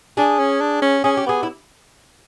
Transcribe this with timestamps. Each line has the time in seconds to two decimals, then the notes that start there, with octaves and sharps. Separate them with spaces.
0.17 D4 G#4
0.39 C#4
0.61 D4
0.82 C#4
1.04 C#4 G#4
1.17 G4
1.26 B3 G#4
1.43 E4